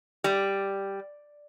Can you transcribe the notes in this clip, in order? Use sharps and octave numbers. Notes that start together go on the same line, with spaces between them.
G3